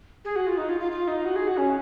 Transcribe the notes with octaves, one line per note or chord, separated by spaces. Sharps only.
G#4
F#4
F4
D#4
F4
F4
F4
D#4
F#4
G#4
F#4
C#4